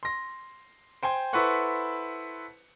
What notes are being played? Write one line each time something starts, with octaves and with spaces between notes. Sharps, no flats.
C6 A#6
C5 G5 G#5 C6
E4 A4 B4 C5 F#5 C#6